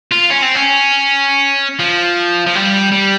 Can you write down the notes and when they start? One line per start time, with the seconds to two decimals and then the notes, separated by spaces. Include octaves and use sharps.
0.11 F4
0.31 C#4
0.42 C4
0.55 C#4
1.80 F3
2.47 F3
2.55 G3
2.92 G3